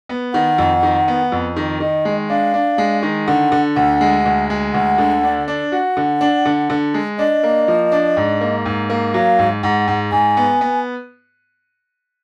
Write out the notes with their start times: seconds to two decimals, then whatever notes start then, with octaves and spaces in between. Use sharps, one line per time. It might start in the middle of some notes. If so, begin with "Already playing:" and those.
0.09 B3
0.33 D#3 F#5
0.58 F2
0.83 D#3
1.08 B3
1.32 F2
1.56 D#3
1.80 D#3 D#5
2.05 G#3
2.30 D4 F5
2.54 D4
2.78 G#3
3.03 D#3
3.27 D3 F#5
3.52 D3
3.76 D2 F#5
4.01 G#3
4.26 D2
4.50 G#3
4.74 D2 F#5
4.98 D3
5.24 D4
5.48 D4
5.72 F#4 F#5
5.97 D3
6.21 D4
6.45 D3
6.70 D3
6.94 G#3
7.19 D4 D#5
7.43 A#3
7.68 F3
7.92 D4
8.17 G#2
8.41 A#3
8.66 G#2
8.90 A#3
9.14 F#3 F5
9.39 G#2
9.63 G#2 F#5
9.88 G#2
10.12 G#2 G#5
10.37 B3
10.61 B3